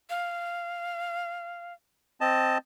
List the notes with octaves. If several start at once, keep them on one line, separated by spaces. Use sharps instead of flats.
F5
C4 D#5 A5